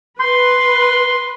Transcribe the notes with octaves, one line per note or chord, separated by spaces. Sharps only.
B4 C6